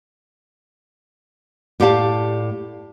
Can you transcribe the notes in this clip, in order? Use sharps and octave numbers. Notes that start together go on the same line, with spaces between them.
A2 G4 D5 F5 A5